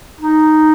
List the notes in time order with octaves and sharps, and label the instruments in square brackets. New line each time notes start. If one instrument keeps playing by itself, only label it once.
[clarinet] D#4